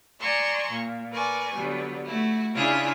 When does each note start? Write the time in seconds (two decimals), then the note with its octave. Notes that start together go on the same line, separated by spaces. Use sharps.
0.20 D5 G#5 A#5 C6 C#6 E6
0.70 A#2
1.11 A#4 B4 D5 G#5 C#6
1.54 D3 F#3 G3 B3
2.06 A3 E4 F#4
2.53 C#3 D4 E4 F4 G#4 E5